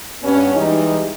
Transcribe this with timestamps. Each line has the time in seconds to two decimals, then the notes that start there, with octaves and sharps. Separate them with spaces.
0.23 G2 B3 C#4
0.55 E3 G3 G#3 D#4